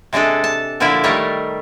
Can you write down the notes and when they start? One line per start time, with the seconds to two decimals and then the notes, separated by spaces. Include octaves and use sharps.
0.13 C3 G#3 D4 G#4 A4
0.44 A5
0.80 A#2 D3 F3 E4 D5 E5
1.04 D#3 G3 A3 A#4 C#5